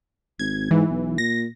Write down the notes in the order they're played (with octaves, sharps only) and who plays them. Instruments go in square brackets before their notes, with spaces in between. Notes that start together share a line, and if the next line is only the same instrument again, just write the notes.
[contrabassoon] G#1 [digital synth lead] G#6
[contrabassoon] G#2 [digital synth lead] E3
[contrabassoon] B1
[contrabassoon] A#2 [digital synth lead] A#6